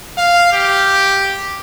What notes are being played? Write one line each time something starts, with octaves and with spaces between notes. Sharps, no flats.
F5
G4